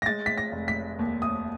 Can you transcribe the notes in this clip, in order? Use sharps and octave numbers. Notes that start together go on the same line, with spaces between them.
A#6
G#3 A6
B6
A#6
F1
B6
D#2
D#6